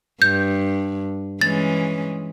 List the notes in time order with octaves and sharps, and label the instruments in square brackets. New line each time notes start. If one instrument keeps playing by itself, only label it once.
[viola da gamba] G2 [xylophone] G6
[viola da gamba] E3 G#3 C#4 [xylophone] A6